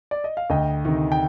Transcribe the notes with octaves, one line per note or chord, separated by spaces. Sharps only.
D5
D#5
F5
D2 D#5 G5
C3 D#3
G5